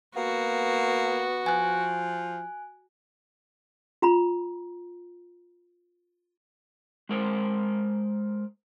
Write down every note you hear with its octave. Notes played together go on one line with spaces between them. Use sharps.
A#3 B3 F#4
F3 G#5 F#6
F4 A#5 B5
G#3 A#4 C5